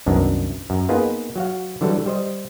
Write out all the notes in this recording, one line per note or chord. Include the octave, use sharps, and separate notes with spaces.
C2 F#2 D#3 B3 D4
F#2
A#3 B3 D#4 F4 G#4 B4
F#3 F#4 F5
D3 E3 F#3 G3 A4
G3 C5 D#5